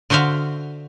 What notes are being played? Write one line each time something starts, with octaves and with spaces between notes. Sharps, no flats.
D3 F#4 C5 E5 F5